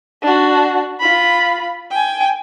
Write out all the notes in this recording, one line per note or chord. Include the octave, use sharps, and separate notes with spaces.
D4 F#4
F4 B5
G5 G#5